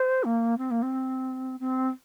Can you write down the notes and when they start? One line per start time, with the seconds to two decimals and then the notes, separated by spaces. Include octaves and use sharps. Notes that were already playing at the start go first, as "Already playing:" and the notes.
Already playing: C5
0.24 A#3
0.58 C4
0.71 A#3
0.82 C4
1.60 C4